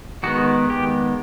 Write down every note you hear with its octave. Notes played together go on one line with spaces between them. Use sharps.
D#3 G#3 B3 F#4
G4